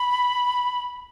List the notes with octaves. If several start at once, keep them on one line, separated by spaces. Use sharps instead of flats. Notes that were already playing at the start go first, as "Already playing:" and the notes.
Already playing: B5